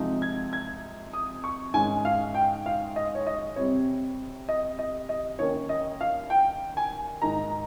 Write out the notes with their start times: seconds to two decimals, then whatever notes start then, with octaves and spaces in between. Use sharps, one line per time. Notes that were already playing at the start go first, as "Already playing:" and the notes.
Already playing: C3 F3 G#3 D#4
0.22 G#6
0.53 G#6
1.13 D#6
1.44 C#6
1.74 G#2 D#3 G#3 C#4 G#5
2.05 F5
2.35 G5
2.66 F5
2.96 D#5
3.15 C#5
3.27 D#5
3.56 C3 G3 C4 C#5
4.49 D#5
4.79 D#5
5.09 D#5
5.39 D#2 D#3 A#3 C#4 C#5
5.69 D#5
6.01 F5
6.30 G5
6.77 G#5
7.22 G#2 D#3 A#3 D#4 A#5